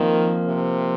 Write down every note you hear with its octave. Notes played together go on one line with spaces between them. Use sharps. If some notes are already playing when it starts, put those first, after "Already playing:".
Already playing: F2 D#3 F3 A#3
C3